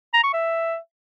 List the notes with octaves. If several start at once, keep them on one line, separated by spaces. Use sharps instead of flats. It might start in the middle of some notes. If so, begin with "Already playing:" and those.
A#5
C#6
E5